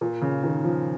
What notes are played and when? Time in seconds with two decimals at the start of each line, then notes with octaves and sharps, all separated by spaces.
0.01 A#2
0.21 C#3
0.43 D#3
0.64 F3